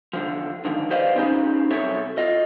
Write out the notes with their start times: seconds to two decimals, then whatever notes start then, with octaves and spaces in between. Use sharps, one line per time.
0.13 E2 D3 F3
0.65 G#2 D3 D#3 F3
0.90 G4 B4 C5 D5 D#5 F5
1.16 C4 C#4 D#4 G4 G#4
1.70 C2 F#2 C4 A4 C#5 E5
2.18 F4 D#5